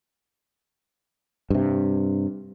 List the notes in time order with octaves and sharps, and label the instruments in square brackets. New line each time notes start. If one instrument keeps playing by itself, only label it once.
[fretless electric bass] G2 C3